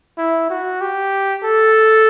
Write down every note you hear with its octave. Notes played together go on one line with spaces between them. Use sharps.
E4
F#4
G4
A4